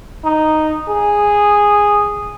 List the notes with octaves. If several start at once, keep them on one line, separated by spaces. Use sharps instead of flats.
D#4
G#4